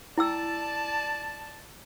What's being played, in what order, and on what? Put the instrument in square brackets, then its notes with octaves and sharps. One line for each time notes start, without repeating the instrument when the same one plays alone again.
[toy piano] E4 G5 E6 [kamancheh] D5 A5